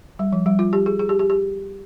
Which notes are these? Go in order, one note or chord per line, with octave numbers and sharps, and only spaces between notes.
G3
F3
G3
F4
G4
G#4
G#4
G4
G4
G4